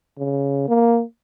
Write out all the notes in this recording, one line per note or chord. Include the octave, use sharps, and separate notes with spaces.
C#3
A#3